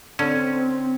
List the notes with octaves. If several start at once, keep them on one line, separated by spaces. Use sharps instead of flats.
D3 C4 C#4